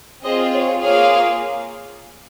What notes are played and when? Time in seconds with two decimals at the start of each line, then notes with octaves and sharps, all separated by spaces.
0.23 C4 F4 G#4 C5 D#5
0.54 C#5
0.82 A#3 F4 G#4 C#5 F5